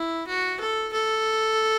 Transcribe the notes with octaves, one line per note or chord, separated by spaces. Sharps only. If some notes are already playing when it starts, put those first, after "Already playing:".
Already playing: E4
F#4
A4
A4